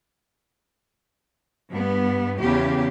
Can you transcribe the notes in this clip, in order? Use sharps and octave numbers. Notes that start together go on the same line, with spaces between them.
G2 B3
E2 C#3 G4